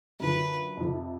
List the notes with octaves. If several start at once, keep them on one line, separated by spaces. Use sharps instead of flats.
F#2 D3 F3 B4
F2 C3 F3